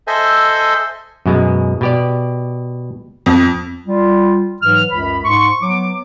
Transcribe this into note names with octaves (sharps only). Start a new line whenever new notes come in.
A4 C5 D#5 E5 G#5
F#2 B2 G#3
B2 G4 D5
F2
G3 F4
G#2 E3 F#3 F6
C#2 F#2 B5
G#2 C6 C#6
F#3 B3 D6